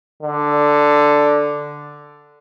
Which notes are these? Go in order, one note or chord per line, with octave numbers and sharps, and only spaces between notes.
D3